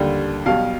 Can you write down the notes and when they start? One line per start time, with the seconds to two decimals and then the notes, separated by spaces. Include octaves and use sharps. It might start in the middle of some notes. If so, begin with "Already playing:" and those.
Already playing: D#2 D3 G3
0.45 B1 B2 G3 F5